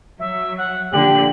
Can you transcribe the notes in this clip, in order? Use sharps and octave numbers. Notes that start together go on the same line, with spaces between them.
F#3 E5
F#5
A#2 D3 F3 G4 F#7